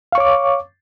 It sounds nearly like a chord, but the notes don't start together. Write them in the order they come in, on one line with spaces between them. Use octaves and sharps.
F5 C#6 C#5 D6